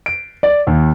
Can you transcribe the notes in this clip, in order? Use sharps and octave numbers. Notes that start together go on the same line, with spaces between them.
D7
D5
D#2